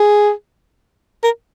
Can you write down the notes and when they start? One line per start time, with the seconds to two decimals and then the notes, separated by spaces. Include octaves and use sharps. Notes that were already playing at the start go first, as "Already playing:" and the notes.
Already playing: G#4
1.23 A#4